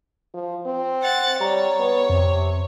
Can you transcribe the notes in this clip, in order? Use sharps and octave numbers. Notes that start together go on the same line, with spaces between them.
F3
C4
F#5 A6
G3 C#5 A#5
B3
F2 C3